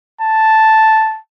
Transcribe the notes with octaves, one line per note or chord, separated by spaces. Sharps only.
A5